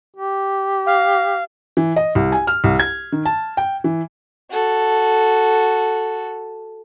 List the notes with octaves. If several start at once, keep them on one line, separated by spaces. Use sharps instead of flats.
G4
F5
E3
D#5
C2
G#5
F6
C2
G#6
D#3
A5
G5
E3
F#4 A4